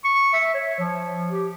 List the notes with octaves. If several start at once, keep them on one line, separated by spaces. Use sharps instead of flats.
C#6
E5
C#5
F3
G4